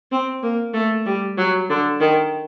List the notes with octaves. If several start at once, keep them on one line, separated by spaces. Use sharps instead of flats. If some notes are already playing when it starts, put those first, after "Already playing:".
C4
A#3
A3
G3
F#3
D3
D#3